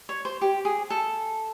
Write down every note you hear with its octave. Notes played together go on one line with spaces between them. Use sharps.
C#5
C5
G4
G#4
A4